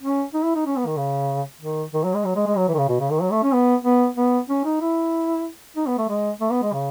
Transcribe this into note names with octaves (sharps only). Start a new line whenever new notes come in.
C#4
D#4
E4
D#4
C#4
B3
D#3
C#3
D#3
D#3
F#3
G#3
F#3
G#3
G#3
F#3
E3
D#3
C#3
B2
C#3
D#3
F#3
A3
C#4
B3
B3
B3
C#4
D#4
E4
D#4
B3
A3
G#3
A3
B3
G#3
C#3